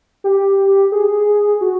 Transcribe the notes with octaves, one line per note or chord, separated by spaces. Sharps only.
G4
G#4
F#4